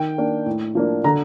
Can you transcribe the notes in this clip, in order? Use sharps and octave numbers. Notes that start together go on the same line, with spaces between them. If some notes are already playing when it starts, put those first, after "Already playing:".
Already playing: D#3 G5
A#3 D4
A2
F3 A#3 D4
D3 A#5